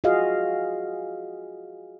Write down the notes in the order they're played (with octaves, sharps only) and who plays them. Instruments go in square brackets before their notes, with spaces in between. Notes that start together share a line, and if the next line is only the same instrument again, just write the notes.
[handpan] F4 F#4 G#4 D#5 F5